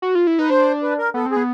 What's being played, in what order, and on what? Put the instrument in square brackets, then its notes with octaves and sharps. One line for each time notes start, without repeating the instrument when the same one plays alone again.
[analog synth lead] F#4
F4
E4
[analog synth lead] D#4 [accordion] B4
[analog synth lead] D4 [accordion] C5
[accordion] B4
A#4
[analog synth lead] B3 [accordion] A4
[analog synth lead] C4
[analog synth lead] B3 [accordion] G#4